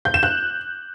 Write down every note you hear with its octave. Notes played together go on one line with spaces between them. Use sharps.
G6
E7
F#6